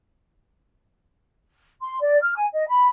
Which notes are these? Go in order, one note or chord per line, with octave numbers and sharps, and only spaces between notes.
C6
D5
F6
G#5
D#5
B5